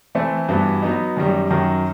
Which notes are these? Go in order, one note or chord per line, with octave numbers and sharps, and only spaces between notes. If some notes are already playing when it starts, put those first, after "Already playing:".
E3 A3 C4
G2 E3 B3 F#4
F#3 B3 D#4
F#2 D#3 G3
F#2 D#3 F#3